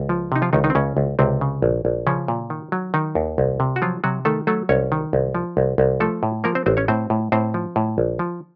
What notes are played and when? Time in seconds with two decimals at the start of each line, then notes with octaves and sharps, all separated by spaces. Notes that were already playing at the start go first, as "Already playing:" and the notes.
Already playing: C#2
0.09 F3
0.32 C3 D#4
0.42 F3 F4
0.53 C#2 D#3 D#4
0.64 D#3 D#4
0.70 C4
0.75 C#2 C#3 C#4
0.97 C#2
1.19 C#2 C3 C4
1.41 C#3
1.62 A#1
1.85 A#1
2.07 C#3 F3 C#4
2.28 A#2
2.50 D#3
2.72 F#3
2.94 D#3 D#4
3.15 D#2
3.38 C2
3.60 C3
3.76 F#4
3.82 F3 F#3 F4
4.04 C3 F#3 F#4
4.25 D#3 A3 A4
4.47 F#3 A3 A4
4.69 C2 C#4 C#5
4.92 D#3
5.13 C2
5.35 F3
5.57 C2
5.78 C2
6.00 F3 A3 A4
6.23 A2
6.44 F3 A#3 A#4
6.55 C4 C5
6.66 A1 C4 C5
6.77 C#4 C#5
6.88 A2 C4 C5
7.10 A2
7.32 A2 C4 C5
7.54 F3
7.76 A2
7.98 A#1
8.19 F3